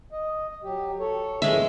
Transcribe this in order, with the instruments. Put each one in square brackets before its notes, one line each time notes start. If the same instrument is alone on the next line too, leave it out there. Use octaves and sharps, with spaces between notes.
[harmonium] D#5
F#3 G4
A4 C#5
[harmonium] F#2 A2 E3 [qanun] G#3 E5